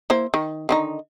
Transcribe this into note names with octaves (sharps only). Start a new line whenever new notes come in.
A#3 E4 C5
D#3
D3 D#3 D#4